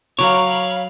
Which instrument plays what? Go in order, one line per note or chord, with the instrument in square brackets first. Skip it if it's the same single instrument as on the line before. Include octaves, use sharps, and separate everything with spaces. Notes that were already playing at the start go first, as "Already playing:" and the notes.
[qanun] F#3 A#4 D6 [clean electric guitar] C#5 [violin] F5 B5